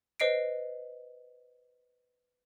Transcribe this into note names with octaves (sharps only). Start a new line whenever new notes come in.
B4 C5 D#5 C7 D7